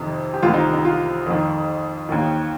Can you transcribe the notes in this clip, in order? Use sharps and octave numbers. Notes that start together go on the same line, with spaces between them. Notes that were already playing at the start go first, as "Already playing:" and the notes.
Already playing: F2 C3 D#3
G4
C2 C3 D#3 F4
D#4
D#4
F4
F2 D#3
D#2 D#3